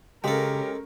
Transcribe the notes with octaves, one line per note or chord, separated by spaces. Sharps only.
C#3 G#3 C#4 G4 A4 A#4